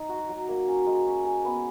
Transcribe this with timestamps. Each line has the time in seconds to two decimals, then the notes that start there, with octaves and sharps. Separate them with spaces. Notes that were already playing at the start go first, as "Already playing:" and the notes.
Already playing: D#4
0.09 F#4
0.29 F#3
0.48 A#3
0.67 C#4
0.86 G#3
1.07 C#4
1.25 G#4
1.45 B3